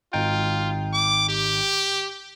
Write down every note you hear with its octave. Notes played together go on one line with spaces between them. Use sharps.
G#1 D#4 F4 G5
D6
G4